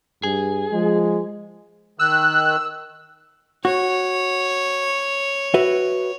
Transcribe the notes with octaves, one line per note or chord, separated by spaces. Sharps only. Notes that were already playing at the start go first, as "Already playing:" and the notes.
G2 G#4
F3 G#3
D#3 E6 F#6
F#4 C#5
F#4 B4 E5